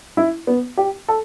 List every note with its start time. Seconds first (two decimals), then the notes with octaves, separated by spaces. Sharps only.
0.17 E4
0.47 B3
0.77 G4
1.08 A4